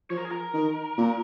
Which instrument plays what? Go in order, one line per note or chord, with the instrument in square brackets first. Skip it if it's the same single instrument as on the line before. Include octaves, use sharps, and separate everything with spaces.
[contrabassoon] F3 [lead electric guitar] C#5
[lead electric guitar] A#4
G#4
A#4
[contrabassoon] D#3
A#2